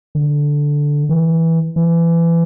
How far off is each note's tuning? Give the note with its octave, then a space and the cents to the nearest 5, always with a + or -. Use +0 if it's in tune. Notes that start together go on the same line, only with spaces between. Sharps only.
D3 -5
E3 -10
E3 +25